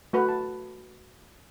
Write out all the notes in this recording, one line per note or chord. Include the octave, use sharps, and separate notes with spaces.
A3 F#4 B4 B5
A5